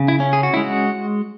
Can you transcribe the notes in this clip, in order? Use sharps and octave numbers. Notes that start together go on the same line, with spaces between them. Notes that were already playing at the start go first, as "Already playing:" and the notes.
Already playing: C#3
E4
C#4
G#4
F#4
G#3 E4
F#4